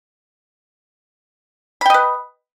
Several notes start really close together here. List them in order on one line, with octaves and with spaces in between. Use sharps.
B5 G5 D#5 B4